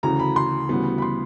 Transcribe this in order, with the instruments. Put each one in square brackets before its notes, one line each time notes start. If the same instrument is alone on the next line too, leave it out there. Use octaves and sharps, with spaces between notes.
[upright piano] D2 C#3 E3 A#5
B5
C6
D2 C#3 E3 G3 B3
B5
C6